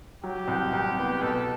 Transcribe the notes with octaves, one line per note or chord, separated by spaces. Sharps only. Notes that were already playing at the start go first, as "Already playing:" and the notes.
F#3 G4
C2
C2
B3
B2 A4